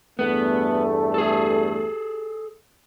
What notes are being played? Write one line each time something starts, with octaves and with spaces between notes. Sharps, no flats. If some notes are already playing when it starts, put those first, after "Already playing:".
E2 G2 A3 B3
G#4 A4